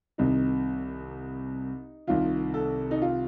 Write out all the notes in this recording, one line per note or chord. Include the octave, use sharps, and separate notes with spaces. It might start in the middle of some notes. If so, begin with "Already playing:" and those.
C2 C3 D#3 D#4
C2 C3 D#3 F4
A4
D#4
F4